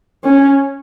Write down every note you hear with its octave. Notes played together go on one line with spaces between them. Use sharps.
C#4